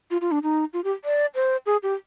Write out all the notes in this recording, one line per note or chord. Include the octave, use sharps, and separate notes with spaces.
F4
F4
D4
D#4
F4
G4
D5
C5
G#4
G4